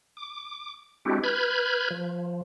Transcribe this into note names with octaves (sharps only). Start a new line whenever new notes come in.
D6
G#3 C4 D4 E4 F#4 G4
B4 B5 F6 G6 G#6
F3